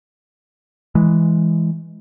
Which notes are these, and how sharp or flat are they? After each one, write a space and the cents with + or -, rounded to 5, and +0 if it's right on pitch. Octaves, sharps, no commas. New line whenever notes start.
E3 +0 G#3 +0